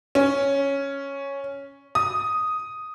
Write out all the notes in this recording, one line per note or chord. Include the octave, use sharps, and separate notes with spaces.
C#4
D#6